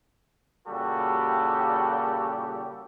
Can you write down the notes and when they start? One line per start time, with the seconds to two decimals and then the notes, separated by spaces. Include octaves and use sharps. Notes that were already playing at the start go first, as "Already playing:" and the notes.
0.67 A#2 C#3 G3 F#4 G4 A4